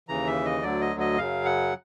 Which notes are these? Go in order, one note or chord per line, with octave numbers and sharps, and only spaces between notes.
D#2 C#3 E3 A#5
E5
D#5
D2 D3 F#3 D5
D#5
D#5
F#2 C#3 F#3 F5
F#5